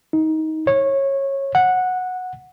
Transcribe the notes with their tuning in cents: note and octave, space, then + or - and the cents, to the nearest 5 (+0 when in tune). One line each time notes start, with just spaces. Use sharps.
D#4 +20
C#5 -20
F#5 -10